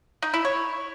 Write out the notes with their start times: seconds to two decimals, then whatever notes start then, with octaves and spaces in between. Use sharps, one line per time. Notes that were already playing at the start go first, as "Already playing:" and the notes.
0.22 D#4
0.34 E4
0.45 C#5